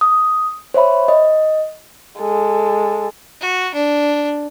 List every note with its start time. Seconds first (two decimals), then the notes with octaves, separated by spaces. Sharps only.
0.01 D#6
0.74 C5 C#5 E5 B5
1.08 D#5
2.19 G#3 A4
3.41 F#4
3.74 D4